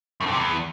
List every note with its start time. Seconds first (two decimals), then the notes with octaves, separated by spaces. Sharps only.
0.21 F#2
0.26 F2
0.32 C3
0.37 E2